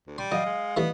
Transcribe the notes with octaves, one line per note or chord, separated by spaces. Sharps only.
D2
G3 C6
F#3 D#5 F5
G#3
E3 G3 A3 B3